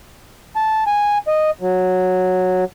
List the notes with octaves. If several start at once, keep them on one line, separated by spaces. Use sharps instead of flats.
A5
G#5
D#5
F#3